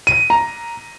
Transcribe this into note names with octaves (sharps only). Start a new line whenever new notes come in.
D#7
A#5